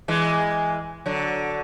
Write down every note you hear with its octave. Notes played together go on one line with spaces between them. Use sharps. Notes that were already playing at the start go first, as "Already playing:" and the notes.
E3 G#3
D3 F#3